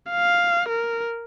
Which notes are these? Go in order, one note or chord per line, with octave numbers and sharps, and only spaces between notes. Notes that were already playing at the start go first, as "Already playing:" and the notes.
F5
A#4